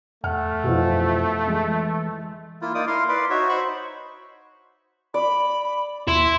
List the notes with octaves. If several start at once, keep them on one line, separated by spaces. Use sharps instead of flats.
E2 A3 F#5 F6
F2 B2 E3 F3
E3 G#3
A#3 E4 F4
A#3 D#4 D5 D#6
E4 A#4 F5 C6
B4 D5 C6
D#4 F#4 C#5 E5
C5 B5 C#6
D5 B5
D#2 E4 C6